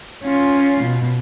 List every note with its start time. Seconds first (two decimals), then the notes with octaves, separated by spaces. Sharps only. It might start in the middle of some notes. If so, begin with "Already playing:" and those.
0.23 C#4 F4
0.83 B2